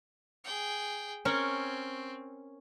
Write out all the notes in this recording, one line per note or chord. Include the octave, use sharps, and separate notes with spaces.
G#4 G5
C4 C#4 A#4 C#5